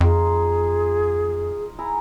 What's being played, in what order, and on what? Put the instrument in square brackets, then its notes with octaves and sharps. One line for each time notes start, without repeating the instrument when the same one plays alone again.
[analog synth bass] F2 [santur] D#4 F4 C6 [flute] G#4
[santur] E4 G#4 A#5